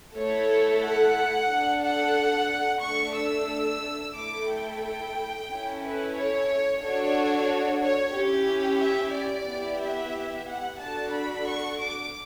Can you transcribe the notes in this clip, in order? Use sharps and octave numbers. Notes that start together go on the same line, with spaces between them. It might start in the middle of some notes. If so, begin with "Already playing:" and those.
A3 E4 A4 C#5
F#5
D4 A4
F#5
A3 D4 A4 C#6
E6
A3 E4 A4 D6
G5
G5
C#4 E4 A4
B4
C#5
D4 F#4 A4 C#5
C#5
C#4 E4 G4
E5
D5
B3 E4 G4
E5
F#5
D4 F#4 A4 A5
B5
C#6
D6